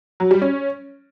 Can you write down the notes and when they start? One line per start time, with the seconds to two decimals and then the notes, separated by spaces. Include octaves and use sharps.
0.20 F#3
0.31 G3
0.42 C#4